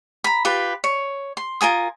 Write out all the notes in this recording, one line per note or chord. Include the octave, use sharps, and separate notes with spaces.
A#5 B5
F4 G4 B4
C#5
C6
F4 A#4 G#5 D#6